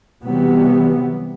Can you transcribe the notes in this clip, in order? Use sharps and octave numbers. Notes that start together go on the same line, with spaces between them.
C3 E3 F#3 G3 B3